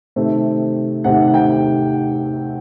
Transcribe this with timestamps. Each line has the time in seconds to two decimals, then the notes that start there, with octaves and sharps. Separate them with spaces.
0.16 C3 D#3 A3 C4
1.04 C3 D#3 A3 C4 F#5
1.28 F#5
1.34 G5